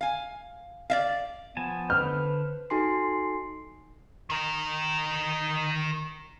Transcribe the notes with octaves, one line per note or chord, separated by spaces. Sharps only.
F5 G#5
D5 E5 F5
F3 B3 G#5 A5
D3 B4 C5 F6 G6
D#4 F#4 A4 G#5 C6 C7
D#3 A#4